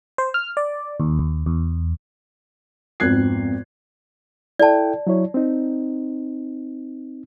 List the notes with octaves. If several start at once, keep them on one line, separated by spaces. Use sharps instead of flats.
C5
F6
D5
D#2
D#2
E2
G#1 F2 B3 F#6 G#6 C7
E4 A4 D5 G5 A5
F#3 E4 C#5
C4 D#4